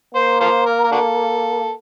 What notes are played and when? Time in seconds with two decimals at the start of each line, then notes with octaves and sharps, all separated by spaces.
0.15 A#3 C5
0.40 F4 A4 C5
0.66 A#4
0.84 A#4
0.91 D4 F#4 A4